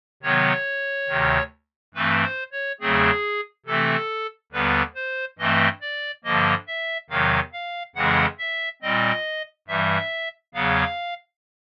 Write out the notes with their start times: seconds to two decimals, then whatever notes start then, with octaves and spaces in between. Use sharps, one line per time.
0.23 C3 D#3 F#3 B3 C#5
1.08 D2 C3 D#3
1.94 G2 E3 A3 C4 B4
2.23 C5
2.52 C#5
2.81 E2 C#3 F#3 A3 C4 G#4
3.66 C3 E3 A3 C4 A4
4.52 D#2 D3 G3 B3 B4
4.95 C5
5.38 G2 E3 A3 C4 D#5
5.81 D5
6.24 G2 D3 F3 A#3 D#5
6.67 E5
7.10 E2 C3 D#3 F#3 F5
7.53 F5
7.96 F2 C#3 E3 G#3 C4 F#5
8.39 E5
8.82 A#2 G3 C4 D#5
9.68 G2 E3 G3 E5
10.54 E2 C#3 F#3 B3 F5